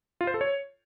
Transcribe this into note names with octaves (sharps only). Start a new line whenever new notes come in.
F4
C5
A4
C#5